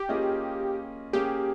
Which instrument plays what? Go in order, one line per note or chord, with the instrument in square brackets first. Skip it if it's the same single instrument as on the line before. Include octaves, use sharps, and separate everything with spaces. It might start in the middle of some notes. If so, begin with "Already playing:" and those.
Already playing: [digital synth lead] G4
[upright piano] A#3 C#4 F4 G#4 D#5
[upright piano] A#3 C#4 G#4 [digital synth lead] G4